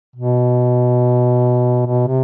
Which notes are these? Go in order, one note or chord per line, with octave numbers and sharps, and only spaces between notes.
B2
B2
C3